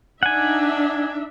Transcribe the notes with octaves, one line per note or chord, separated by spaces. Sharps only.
D4 D#4 E5 F#5 G#5